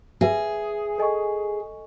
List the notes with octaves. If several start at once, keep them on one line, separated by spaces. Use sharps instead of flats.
G#4 B4 E5 G#5
A4 D#5 G#5 C#6